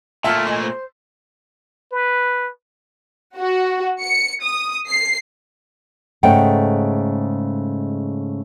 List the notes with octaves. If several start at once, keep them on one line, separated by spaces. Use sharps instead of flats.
A#2 A3 F4 E5 A5
C#5 D#5 G#5 C6
C5
B4
F#4
C#7
D#6
C7
G#2 C#3 G#3 A3 F#5 G5